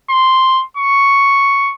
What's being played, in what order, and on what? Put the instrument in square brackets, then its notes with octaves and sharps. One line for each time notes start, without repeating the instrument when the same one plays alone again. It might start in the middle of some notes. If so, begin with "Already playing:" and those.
[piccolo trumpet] C6
C#6